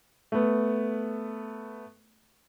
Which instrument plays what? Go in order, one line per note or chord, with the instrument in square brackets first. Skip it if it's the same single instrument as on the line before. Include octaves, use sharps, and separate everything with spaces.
[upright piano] A3 B3